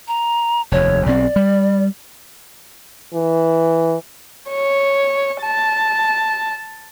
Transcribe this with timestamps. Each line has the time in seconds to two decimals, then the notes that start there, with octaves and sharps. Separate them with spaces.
0.08 A#5
0.72 F1 D#2 C#5
1.06 B1 C4 D5
1.36 G3
3.14 E3
4.50 C#5
5.42 A5